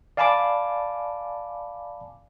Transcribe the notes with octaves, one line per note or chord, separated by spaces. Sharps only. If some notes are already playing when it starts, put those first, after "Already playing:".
D5 F5 G#5 A5 B5 D6